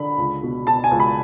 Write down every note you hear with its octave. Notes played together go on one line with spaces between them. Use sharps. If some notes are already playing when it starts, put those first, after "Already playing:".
Already playing: D3 B5
C#2
B2
B2 A5
G#5
C#2
B5